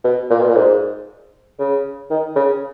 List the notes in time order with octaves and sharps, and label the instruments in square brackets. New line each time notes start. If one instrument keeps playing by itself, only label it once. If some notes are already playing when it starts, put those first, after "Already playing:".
[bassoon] B2
A#2
B2
A#2
G#2
C#3
D#3
C#3